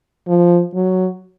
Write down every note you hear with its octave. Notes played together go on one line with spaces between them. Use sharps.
F3
F#3